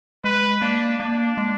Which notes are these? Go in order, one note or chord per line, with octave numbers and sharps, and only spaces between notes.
G#3 B4
A#3 D4
A#3 D4
G#3